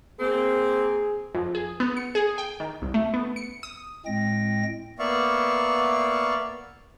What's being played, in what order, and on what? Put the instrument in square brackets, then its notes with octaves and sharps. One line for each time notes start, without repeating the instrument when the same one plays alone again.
[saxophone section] A#3 C4 [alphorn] G#4
[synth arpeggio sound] F2
G#4
B3
C#7
G#4
G5
D#3
C2
A3
B3
C#7
D#6
[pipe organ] A2 G#3 C4 G5 A#6
[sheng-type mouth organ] A#3 B3 D5 E5 F5 C#6